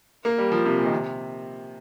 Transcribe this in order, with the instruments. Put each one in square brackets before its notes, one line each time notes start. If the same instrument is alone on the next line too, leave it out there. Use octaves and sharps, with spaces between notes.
[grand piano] A#3
G3
F3
C3
A#2
D#3
C3